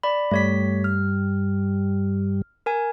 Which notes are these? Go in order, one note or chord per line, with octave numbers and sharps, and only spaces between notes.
D5 B5
G2 G3 A3 C#5 B6
F6
A#4 G#5